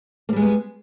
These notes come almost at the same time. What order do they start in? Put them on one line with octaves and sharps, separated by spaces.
A#3 G3 G#3 B3